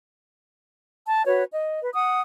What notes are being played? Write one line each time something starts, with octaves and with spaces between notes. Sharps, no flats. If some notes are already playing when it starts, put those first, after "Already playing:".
A5
F#4 B4 C#5
D#5
B4
F#5 D#6